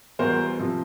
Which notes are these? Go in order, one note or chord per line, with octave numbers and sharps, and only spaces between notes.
E2 B2 G3 A#4 C5
C3 F3